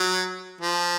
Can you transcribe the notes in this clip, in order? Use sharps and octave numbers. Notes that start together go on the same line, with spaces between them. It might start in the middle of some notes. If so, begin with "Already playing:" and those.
Already playing: F#3
F3